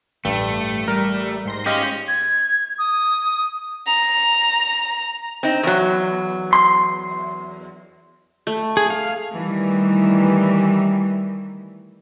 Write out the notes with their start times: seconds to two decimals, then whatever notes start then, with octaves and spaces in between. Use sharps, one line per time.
0.25 A1 G2 A3
0.88 G3 A#4
1.45 G#2 C6 A#6
1.66 C#4 G4 D#5 F5
2.08 G#6
2.79 D#6
3.86 A#5
5.43 C4 D#4
5.63 E2 F#3
6.53 C6
8.47 A3
8.77 G#4
8.90 F5
9.33 D#3 E3 G3 A3